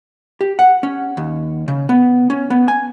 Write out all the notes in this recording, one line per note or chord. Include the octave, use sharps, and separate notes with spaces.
G4
F#5
C#4
D#2
C#3
B3
C#4
B3
G#5